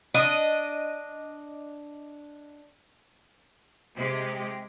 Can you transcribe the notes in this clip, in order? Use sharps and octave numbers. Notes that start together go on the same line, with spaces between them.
D4 D#5
C3 G#3 G4